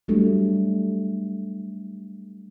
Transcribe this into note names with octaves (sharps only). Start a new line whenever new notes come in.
F#3 G3 A3 D4